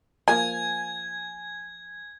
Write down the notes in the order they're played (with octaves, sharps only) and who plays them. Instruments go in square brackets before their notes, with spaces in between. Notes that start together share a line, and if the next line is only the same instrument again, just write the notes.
[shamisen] F3 A#3 [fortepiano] G#5 [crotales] G#6